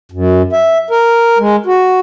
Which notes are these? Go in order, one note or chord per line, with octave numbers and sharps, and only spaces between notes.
F#2
E5
A#4
G#3
F#4